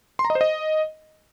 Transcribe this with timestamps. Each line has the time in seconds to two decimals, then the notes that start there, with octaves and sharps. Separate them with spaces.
0.19 C6
0.25 A#5
0.30 D#5
0.35 C5
0.41 D#5